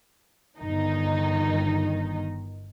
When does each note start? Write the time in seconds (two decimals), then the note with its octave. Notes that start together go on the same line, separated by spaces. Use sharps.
0.58 G1 D#3 D#4